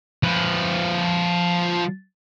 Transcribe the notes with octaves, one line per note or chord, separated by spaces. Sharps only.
F3 B4